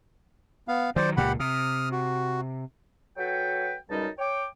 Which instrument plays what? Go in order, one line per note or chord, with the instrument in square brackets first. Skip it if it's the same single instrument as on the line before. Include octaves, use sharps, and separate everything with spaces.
[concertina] B3 F5
[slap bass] D#3 F#3 [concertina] C5 D5
[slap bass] C#2 A#2 [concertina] G4 F#5 B5
[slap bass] C3 [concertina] D#6 F6
[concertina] F#4
[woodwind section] F#3 F#4 A4 B4 G5
C#2 F#2 G3 D#4 D#5 A5
C#5 G5 D6